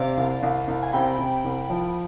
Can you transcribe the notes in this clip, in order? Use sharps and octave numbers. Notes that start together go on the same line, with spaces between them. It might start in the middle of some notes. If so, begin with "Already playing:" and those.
Already playing: C3 D5 F5
C2
C2
C2
G#5
C3 G5 B5
C3
C2
F3